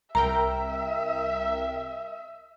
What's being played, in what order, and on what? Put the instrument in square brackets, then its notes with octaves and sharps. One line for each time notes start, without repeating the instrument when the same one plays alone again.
[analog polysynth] C2 A#4 G5 [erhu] E5 [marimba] A#5